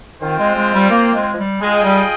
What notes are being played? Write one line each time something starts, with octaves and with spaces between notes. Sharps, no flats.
D#3 C4 F4 C5 G5
G#3
G#3
G3
A#3
G#3
F3
G3
G#3 F4 G#4 D#5 G5
G3